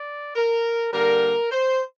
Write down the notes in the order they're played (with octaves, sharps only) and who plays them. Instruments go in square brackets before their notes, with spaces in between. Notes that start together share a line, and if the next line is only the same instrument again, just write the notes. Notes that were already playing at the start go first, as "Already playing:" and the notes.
Already playing: [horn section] D5
A#4
D3 G3 A#3 A#4
C5